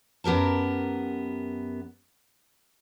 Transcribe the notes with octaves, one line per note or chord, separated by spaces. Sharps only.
F#2 B3 G4 A#4 A5